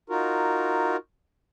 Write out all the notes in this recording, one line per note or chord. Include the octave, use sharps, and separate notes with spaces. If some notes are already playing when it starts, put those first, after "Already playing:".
D#4 F4 F#4 A#4